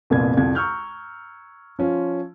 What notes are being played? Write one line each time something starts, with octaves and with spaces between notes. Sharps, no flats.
C2 F2 A#2 B3 G#6
C2 F2 G#6
A#5 C#6 E6 F6 G6
F3 C#4 F4